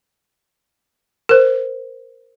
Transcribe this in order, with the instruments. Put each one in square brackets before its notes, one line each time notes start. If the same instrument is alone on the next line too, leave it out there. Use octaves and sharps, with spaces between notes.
[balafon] A#4 C5